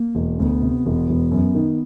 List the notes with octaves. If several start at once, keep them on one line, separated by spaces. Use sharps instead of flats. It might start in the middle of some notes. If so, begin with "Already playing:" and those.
Already playing: A#3
E1
D2 B3 C#4
C3
E1
E1
F#2
D#3